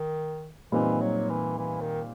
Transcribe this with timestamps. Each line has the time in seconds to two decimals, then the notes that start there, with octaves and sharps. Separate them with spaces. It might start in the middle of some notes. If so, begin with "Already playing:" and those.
Already playing: D#3
0.72 A#2 E3 G3 C4 D#4
1.01 F#3
1.30 E3
1.58 E3
1.81 D#3